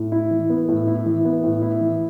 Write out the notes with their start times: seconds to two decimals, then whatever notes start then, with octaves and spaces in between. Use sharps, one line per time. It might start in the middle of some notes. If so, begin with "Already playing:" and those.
Already playing: A2
0.12 E4
0.31 E3
0.50 B3
0.68 A2
0.87 E4
1.06 E3
1.25 B3
1.44 A2
1.62 E4
1.81 E3